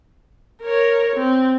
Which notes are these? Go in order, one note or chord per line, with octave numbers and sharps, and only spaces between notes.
A#4 C#5
C4